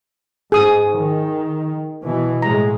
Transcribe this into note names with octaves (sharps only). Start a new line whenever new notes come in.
G#2 G#4 D#6
D#3
B2 E3
A2 G#3 A#5